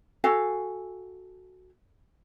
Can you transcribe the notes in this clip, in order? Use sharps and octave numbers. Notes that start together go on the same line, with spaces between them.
F#4 A4 F5 G#5